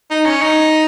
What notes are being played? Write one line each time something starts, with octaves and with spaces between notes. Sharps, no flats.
D#4
C#4
D#4